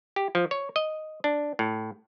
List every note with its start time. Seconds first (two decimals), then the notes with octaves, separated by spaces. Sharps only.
0.16 G4
0.35 F3
0.51 C#5
0.76 D#5
1.24 D4
1.59 A2